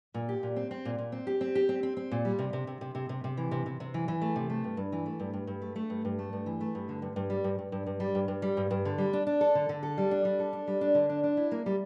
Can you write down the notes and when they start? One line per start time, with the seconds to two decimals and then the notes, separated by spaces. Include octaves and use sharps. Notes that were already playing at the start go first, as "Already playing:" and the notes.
0.14 A#2
0.29 G4
0.43 A#2
0.56 C4
0.71 C4
0.85 A#2
0.98 A#2
1.12 C4
1.27 G4
1.41 C4
1.55 G4
1.69 C4
1.83 C4
1.97 C4
2.11 A#2
2.25 G3
2.39 C3
2.53 C3
2.67 C3
2.81 C3
2.95 C3
3.09 C3
3.24 C3
3.37 E3
3.51 C3
3.66 C3
3.80 C3
3.94 E3
4.08 E3
4.21 A3
4.36 C3
4.50 A3
4.64 G2
4.77 G2
4.92 E3
5.06 A3
5.20 G2
5.33 G2
5.47 G2
5.62 A3
5.76 A3
5.90 G2
6.05 G2
6.19 A3
6.33 G2
6.46 E3
6.61 A3
6.75 G2
6.89 D3
7.02 G2
7.16 G2
7.30 G3
7.44 G2
7.59 G2
7.72 G2
7.86 G2
8.00 G3
8.15 G2
8.28 G2
8.42 G3
8.57 G2
8.71 G2
8.85 D3
8.98 G3
9.13 D4
9.27 D4
9.41 A4
9.55 D3
9.69 D3
9.83 A4
9.98 G3
10.11 D4
10.25 G3
10.39 A4
10.53 D4
10.67 G3
10.81 D4
10.95 D3
11.09 D4
11.24 D4
11.37 E4
11.51 A#3
11.66 G3